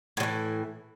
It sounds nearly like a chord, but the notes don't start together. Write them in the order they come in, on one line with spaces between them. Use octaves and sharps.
A2 F#3 E3